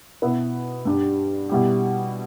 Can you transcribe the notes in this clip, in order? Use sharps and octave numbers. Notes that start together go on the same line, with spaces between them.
B2 B3 E4 B4
G2 G3 D4 G4
B2 G3 E4 G4